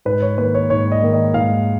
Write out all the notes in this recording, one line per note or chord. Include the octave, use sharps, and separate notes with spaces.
G#2 B4
C#5
D#3 A#3 B4
C#5
G#2 C#5
D#5
D#3 A#3
D#5
G#2 F5